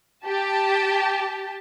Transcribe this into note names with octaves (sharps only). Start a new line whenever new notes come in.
G4 A5